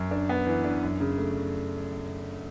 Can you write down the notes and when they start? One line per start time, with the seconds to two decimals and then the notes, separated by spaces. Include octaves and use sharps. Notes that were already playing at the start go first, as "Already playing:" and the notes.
Already playing: F#2
0.11 D4
0.29 B3
0.47 E3
0.64 D4
0.83 F#2
1.00 C#3
1.18 A3